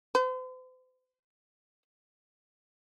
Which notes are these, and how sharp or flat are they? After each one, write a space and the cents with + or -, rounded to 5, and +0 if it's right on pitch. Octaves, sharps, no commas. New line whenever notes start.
C5 -45